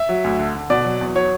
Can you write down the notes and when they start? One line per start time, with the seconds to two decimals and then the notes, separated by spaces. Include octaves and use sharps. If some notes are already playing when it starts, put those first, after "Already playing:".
Already playing: E5
0.09 F#3
0.24 D2
0.39 D3
0.54 D3
0.70 B2 D5
0.85 F#3
1.01 E2
1.15 F#3 C#5